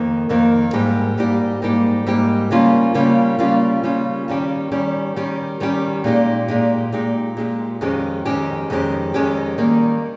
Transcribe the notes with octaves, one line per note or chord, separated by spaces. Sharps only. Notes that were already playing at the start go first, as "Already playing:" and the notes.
Already playing: F2 D#3 A#3
F2 D#3 A#3
G#2 G3 A#3 D#4 G4
G#2 G3 A#3 D#4 G4
G#2 G3 A#3 D#4 G4
G#2 G3 A#3 D#4 G4
C#3 G3 A#3 C#4 F4
C#3 G3 A#3 C#4 F4
C#3 G3 A#3 C#4 F4
C#3 G3 A#3 C#4 F4
D#3 G3 C#4 G4
D#3 G3 C#4 G4
D#3 G3 C#4 G4
D#3 G3 C#4 G4
A#2 G#3 D#4 G4
A#2 G#3 D#4 G4
A#2 G#3 D#4 G4
A#2 G#3 D#4 G4
F2 D#3 G#3 C#4 G4
F2 D#3 G#3 C#4 G4
F2 D#3 G#3 C#4 G4
F2 D#3 G#3 C#4 G4
D#3 G3 A#3